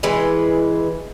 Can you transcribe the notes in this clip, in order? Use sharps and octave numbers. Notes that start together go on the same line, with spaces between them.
E3 G#3 B4